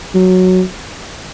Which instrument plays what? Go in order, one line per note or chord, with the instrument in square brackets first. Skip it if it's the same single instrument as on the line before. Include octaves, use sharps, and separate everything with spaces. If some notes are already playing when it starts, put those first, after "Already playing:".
[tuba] F#3